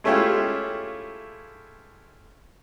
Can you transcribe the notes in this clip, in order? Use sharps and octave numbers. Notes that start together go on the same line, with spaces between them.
G#3 A3 C#4 E4 F4 G4